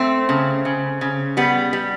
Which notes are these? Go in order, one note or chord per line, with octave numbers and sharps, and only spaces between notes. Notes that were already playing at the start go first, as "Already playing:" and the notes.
Already playing: A3 C4
C#3
C#3
C#3
G3 B3
G3